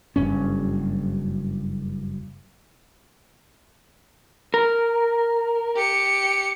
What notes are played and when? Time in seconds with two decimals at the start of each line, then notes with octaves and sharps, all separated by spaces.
0.16 F#1 G2 C#4
4.54 A#4
5.76 G4 C#7